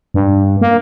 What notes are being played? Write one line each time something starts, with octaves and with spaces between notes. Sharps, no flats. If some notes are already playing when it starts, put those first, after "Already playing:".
G2
A#3